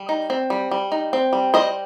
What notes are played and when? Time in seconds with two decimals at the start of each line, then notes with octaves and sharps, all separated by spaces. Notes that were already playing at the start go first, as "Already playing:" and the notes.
Already playing: G3
0.09 D#4
0.30 C4
0.50 G3
0.71 G3
0.92 D#4
1.13 C4
1.33 G3
1.54 G3 C5 D#5